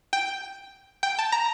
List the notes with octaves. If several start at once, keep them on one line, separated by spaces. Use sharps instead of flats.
G5
G5
A5
A#5